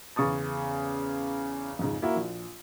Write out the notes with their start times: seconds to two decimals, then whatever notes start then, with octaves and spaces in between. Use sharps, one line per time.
0.16 E2 C#3 C#6 D#6 A6
1.79 F2 G#2 C#3
2.02 A#3 E4 F#4 A#4
2.16 A#1